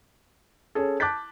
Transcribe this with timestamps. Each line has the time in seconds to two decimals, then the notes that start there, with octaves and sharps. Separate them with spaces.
0.75 C#4 G#4 A4
1.00 A5 D6 F#6 G6 A6 B6